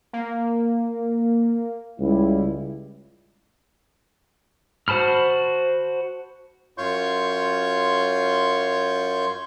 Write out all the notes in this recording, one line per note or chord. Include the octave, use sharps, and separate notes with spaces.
A#3
C#2 G3 E4
F#4 C5 A5 B5 F6
F#2 F4 C#5 C6 C#6 G6